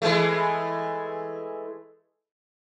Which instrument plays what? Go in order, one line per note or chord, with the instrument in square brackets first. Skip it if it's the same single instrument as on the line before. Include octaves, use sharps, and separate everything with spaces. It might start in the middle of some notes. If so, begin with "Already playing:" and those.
[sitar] E3 G#3 A3